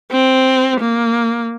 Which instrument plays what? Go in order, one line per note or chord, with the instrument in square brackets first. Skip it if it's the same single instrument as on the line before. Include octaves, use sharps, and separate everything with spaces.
[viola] C4
A#3